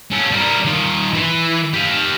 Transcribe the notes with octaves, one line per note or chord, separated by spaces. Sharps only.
C#4 A4
G3 A#4
D#3 F4
E3
G4 F5